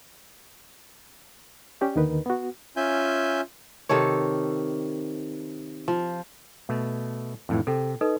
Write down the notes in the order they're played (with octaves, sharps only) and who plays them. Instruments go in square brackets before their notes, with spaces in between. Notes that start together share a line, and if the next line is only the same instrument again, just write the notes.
[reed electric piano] C#4 G4 D5
D#2 D3 D#3 D#4 A#4 B4
B3 F#4
[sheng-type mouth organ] C#4 F4 E5 G#5 G6
[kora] C3 D#3 A4 C#5
F3
[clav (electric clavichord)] B2 A3
F2 A2 E3
[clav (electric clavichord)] C3 [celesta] A4 G5
[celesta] D#4 A4 B4 [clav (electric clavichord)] D#5